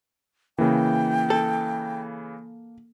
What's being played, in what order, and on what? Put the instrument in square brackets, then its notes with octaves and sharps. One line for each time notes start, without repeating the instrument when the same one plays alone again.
[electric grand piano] C#3 E3 [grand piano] A#3 [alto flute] G5
[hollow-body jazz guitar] A4